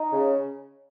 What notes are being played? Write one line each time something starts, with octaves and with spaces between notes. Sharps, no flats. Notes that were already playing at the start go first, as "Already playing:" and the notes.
Already playing: D#4
C#3